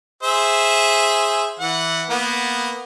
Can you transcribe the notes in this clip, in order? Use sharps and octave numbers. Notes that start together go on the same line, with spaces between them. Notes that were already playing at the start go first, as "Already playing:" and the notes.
G#4 C5 E5
E3 F#5
A#3 B3